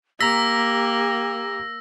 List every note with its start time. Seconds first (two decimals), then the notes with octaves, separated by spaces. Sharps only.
0.21 A#3 G4 A#5 E6 A#6 B6